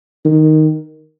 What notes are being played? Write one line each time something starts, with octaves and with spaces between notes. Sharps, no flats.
D#3